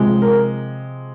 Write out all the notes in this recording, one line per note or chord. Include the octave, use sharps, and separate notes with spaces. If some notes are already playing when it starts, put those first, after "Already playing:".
Already playing: C3 F3 G#3
A#4